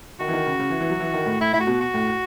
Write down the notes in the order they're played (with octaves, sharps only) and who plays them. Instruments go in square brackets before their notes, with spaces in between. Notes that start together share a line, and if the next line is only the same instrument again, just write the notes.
[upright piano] D#3 [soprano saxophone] F#4
[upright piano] E3
D#3
C#3
C#3
E3
E3
F#3
E3
D#3
A2
[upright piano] A2 [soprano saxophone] E4
[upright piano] A2 [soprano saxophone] E4
[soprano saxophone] F#4
[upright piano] B2
[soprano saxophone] F#4
[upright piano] A2